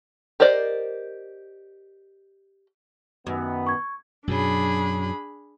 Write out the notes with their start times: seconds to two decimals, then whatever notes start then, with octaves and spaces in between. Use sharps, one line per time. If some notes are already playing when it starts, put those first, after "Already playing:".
0.40 G4 A#4 C5 D5 D#5
3.27 F#2 D#3 B3
3.67 C#6 G#6
4.27 F#2 B2 F#3 D4 G#4 B5